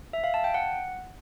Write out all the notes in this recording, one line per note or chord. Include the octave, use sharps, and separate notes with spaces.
E5
F5
A5
G5
F#5